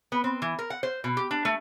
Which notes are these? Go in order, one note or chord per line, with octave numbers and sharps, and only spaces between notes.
B3
C4
E3
A#4
F#5
C5
B2
G4
D4
A3